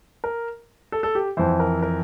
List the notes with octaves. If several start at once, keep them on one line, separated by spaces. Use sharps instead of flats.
A#4
A4
A4
G4
F2 E3 C5
A#4
A#4